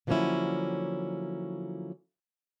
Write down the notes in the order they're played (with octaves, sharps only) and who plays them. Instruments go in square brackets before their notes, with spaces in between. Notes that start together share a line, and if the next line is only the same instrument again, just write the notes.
[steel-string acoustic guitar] D3 F3 F#3 A#3 C#4 E4